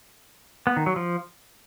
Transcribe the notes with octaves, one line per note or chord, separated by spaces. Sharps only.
B3
D#3
F#3
F3